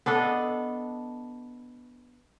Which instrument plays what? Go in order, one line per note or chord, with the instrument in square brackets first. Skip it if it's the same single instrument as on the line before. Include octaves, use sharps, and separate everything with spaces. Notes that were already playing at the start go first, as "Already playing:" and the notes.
[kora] B3 D4 A4 D#5